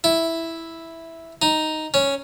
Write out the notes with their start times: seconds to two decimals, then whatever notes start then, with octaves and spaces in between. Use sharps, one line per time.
0.04 E4
1.42 D#4
1.94 C#4